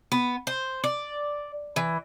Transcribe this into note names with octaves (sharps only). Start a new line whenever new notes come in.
B3
C5
D5
E3